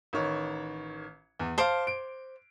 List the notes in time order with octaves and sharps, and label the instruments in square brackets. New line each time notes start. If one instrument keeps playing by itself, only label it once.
[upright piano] A1 D#3 C#5
E2
[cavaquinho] C5 D6 [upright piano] F5 A5
[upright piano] D7